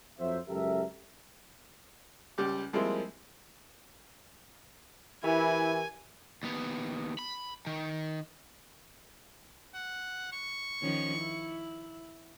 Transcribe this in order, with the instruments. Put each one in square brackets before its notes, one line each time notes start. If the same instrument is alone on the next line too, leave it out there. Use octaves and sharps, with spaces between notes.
[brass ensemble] F2 F#3 C5 E5
C#2 F#2 G4 A4 A#4 E5
[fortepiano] C#2 G3 G4 D6
F3 G3 G#3 A#3 C4 E4
[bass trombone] E3 [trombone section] E4 [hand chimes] G4 A#4 [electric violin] G#5
[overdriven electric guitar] D#2 B3
B5
D#3
[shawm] F#5
C#6
[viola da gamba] D#3 F3 C#4
E4